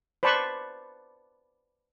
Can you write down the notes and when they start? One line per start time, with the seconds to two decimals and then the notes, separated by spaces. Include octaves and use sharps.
0.23 B4 C5 D5 A5 B5 C#6